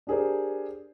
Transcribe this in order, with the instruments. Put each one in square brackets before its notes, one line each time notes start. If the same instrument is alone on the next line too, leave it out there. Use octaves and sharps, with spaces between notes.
[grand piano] D4 G4 G#4 A#4 C5